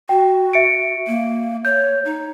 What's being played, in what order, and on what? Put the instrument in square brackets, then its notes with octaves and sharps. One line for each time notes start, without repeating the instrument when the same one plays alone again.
[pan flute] F#4 [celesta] G5
[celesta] E5 C#7 D7
[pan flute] A#3
[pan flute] C#5 [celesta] G6
[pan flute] D#4